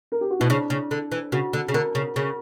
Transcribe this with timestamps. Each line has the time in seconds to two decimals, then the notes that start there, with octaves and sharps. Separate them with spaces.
0.12 A#4
0.21 G4
0.31 F#4
0.39 B2 E4
0.49 C#3 D4
0.70 C#3
0.91 D3
1.12 E3
1.32 C#3 F#4
1.53 D3
1.68 C#3
1.74 D3 A#4
1.95 C#3
2.16 C#3